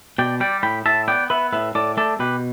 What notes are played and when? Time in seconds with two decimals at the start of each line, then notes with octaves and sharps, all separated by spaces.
0.18 B2 D5 G5
0.40 G3 D5 G5
0.63 A2 G5 B5
0.86 A2 E5 A5
1.08 B3 D5 G5
1.30 B3 B4 E5
1.53 A2 B4 E5
1.75 A2 A4 D5
1.97 A3 A4 D5
2.19 B2 G4 B4